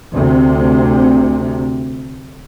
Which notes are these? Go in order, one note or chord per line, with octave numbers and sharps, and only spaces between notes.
D2 C3